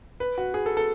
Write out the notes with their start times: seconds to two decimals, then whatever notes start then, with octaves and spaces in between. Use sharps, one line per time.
0.20 B4
0.38 F#4
0.54 G#4
0.66 A4
0.77 A4